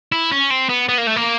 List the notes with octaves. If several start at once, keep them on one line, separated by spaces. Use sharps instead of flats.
E4
C#4
C4
B3
B3
A#3
A3
A#3